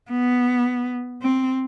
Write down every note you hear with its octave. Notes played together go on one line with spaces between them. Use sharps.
B3
C4